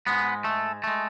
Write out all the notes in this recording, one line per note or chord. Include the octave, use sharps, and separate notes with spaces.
G#2 G#3 B3
A3
G#3 A3